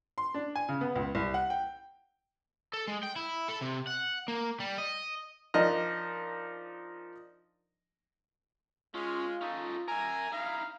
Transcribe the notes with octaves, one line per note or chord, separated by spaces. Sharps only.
C6
D4
G#5
C#3
B3
C#2
C2
F#5
G5
A4
G#3
G5
E4
A4
C3
F#5
A#3
G3
D#5
F3 D4 D#4 A#4 D5 D#5
G#3 C#4 F4
C#4 D#4 A4
A#4 E5 G#5 A#5
D#4 E4 F5